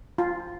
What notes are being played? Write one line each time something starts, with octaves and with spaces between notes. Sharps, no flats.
F4